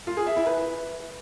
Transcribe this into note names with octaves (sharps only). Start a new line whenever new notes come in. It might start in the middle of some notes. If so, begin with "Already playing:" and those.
F4
G#4
E5
E4
B4